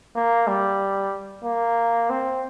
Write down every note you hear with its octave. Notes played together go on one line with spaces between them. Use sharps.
A#3
G3
A#3
C4